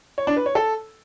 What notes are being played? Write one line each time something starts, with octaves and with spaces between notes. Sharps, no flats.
C#5
D4
B4
C#5
A4